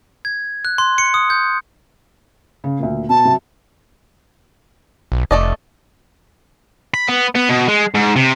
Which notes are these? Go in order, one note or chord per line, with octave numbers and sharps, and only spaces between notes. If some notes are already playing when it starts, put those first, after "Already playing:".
G#6
F#6
C6
C#7
D#6
G6
C#3
D2 A#2
B2 A5
C3 F#3
B1
F1 A3 D5 D#5
B5
B3
B3
B2
G#3
G#2
C3